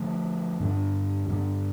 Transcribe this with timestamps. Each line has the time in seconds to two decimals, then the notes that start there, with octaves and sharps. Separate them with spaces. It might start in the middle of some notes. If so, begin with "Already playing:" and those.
Already playing: D3 F3 A3
0.60 G2 D3 G3 D4
1.28 G2 D3 G3 D4